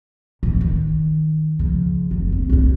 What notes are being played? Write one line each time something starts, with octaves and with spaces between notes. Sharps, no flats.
A1 F2
D#3
C#3 F3
F#1 C#2
C4
C2 G#2